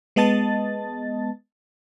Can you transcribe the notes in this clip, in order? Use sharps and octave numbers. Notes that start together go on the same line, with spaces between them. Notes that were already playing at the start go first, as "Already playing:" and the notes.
G#3 B3 D#5 A5 A6